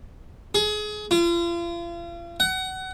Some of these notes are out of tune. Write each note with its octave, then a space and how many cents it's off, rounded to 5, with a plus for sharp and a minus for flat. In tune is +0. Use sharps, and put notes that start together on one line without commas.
G#4 +25
F4 -40
F#5 +25